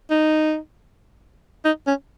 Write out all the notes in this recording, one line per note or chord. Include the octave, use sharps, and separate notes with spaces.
D#4
D#4
C#4